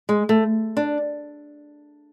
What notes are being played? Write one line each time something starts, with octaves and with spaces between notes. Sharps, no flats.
G#3
A3
D4